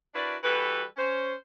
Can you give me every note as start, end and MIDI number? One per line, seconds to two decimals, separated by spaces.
0.14 0.36 62
0.14 0.36 64
0.14 0.36 66
0.14 0.36 70
0.14 0.36 71
0.14 0.36 74
0.43 0.83 52
0.43 0.83 55
0.43 0.83 66
0.43 0.83 69
0.43 0.83 71
0.97 1.33 61
0.97 1.33 72